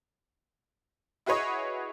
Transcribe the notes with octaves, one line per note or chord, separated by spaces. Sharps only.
E4 F#4 G#4 B4 C#5 D#5